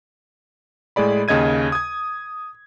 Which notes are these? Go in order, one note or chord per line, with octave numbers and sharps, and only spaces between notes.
A2 G#3 G#4 D5 B5
D#2 C#3 D#5 G#6 D#7
D#6 G#6